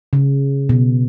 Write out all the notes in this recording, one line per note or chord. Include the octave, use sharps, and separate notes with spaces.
C#3
B2